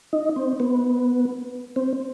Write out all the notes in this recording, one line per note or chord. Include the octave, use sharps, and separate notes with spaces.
D#4
C4
B3
C4